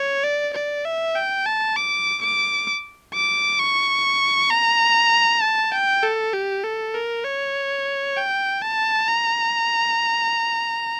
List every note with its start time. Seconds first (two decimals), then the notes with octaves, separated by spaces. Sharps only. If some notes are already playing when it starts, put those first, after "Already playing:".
Already playing: C#5
0.24 D5
0.54 D5
0.85 E5
1.15 G5
1.46 A5
1.76 D6
2.22 D6
3.14 D6
3.59 C#6
4.51 A#5
5.42 A5
5.73 G5
6.03 A4
6.34 G4
6.64 A4
6.94 A#4
7.25 C#5
8.17 G5
8.62 A5
9.08 A#5